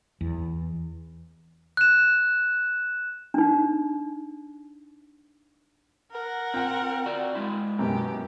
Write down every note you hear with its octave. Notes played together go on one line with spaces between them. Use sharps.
E2
F#6 E7
D4 D#4
A#4 F#5
C4 F4 G5
F#4 D5
G#3 E4
F#2 B2 G4